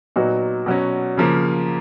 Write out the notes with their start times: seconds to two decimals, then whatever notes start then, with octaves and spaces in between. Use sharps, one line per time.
0.16 A#2 F#3 B3 D#4 F#4
0.66 B2 F#3 C#4
1.18 C#3 F3 A#3